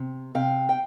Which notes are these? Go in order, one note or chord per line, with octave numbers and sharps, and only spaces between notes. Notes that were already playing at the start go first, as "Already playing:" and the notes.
Already playing: C3
C3 F5 G5
G5